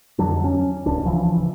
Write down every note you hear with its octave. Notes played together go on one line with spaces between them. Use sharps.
F2 D3 F#3 D4
C#4
D1 C#2 D4
C#3 E3 F3